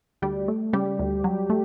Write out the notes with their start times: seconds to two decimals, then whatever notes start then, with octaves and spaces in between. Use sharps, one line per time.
0.22 D2 G3 G4
0.48 A3
0.73 C#3 G3 G4
0.99 D2
1.24 F#3
1.50 A3